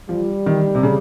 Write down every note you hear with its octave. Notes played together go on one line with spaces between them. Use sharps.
F3 G3
D#3
C3
C#3